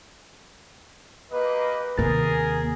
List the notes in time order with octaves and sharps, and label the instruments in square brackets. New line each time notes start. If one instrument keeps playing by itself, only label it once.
[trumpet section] A#3 G4 D#5 [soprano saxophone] B4
[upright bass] D#2 C3 [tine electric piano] A#3 A6 [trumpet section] G#4 [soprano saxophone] A#4